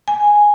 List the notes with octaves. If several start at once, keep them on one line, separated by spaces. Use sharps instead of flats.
G#5